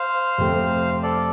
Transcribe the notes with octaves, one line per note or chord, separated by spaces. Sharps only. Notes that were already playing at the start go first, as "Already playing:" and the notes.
Already playing: C5 F5
F2 C3 A3 C4 G4
A4 D5